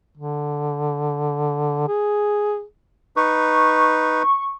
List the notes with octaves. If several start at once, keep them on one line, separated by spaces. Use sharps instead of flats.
D3
G#4
D#4 B4 C#6